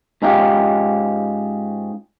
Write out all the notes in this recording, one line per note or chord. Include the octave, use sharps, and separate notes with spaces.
G#2 C#4 D#4 F4 G4